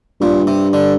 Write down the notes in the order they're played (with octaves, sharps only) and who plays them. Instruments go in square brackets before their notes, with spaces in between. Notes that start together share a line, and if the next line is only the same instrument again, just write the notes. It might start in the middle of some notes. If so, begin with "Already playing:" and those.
[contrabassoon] G2 [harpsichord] A#2
[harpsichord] C3
D3